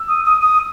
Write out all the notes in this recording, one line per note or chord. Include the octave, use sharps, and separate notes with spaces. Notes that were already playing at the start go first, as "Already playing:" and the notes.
Already playing: E6
D#6
D#6
D#6